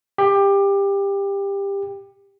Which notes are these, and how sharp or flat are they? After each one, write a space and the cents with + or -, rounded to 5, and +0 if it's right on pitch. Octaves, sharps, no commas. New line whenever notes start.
G4 +20